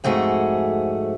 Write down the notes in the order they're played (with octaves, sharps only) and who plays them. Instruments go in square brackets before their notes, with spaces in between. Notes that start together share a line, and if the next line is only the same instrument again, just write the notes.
[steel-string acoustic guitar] F2 G#2 A3 F#4 G#4